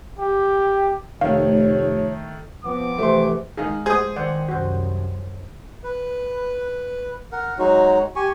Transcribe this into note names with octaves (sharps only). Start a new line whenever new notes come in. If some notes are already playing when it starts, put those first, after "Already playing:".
G4
F1 D#3 A3 C#5 F5
F3 B3 C4 D6
G#2 C3 E3 A3 C6
D#3 G#3 G#4 F5
G#4 C5 D#6
D#3 C5 D5 F#5
C2 F#2 F#4 C5
B4
A#4 F#5
F#3 G#3 D#4 F#4
G4 G#5 C#6